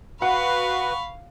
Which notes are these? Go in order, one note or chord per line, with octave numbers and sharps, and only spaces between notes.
F#4 B4 F5 F#5 B5 C#6